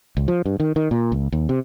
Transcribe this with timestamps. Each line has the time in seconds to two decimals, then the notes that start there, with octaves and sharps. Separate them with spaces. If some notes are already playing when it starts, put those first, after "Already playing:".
0.17 C#2
0.28 F3
0.46 G2
0.60 D#3
0.76 D#3
0.91 A#2
1.12 C#2
1.32 D#2
1.49 C3